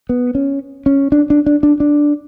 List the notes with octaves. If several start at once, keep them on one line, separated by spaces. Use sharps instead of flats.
B3
C#4
C#4
D4
D4
D4
D4
D4